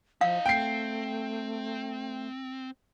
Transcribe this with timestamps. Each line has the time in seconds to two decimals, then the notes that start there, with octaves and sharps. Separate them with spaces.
0.21 F3 E4 D#5 F5
0.46 A3 C4 G5 C7